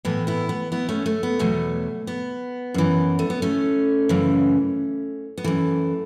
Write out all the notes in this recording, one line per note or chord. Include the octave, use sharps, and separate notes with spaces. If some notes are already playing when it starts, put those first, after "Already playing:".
A2 E3 B3
B3 E4
B3
B3 E4
A3 C#4
A3
B3
E2 B2 F#3 A3
B3
F#2 E3
A3
B3
A3 C#4
F#2 C#3 E3
B3
F#2 E3 A3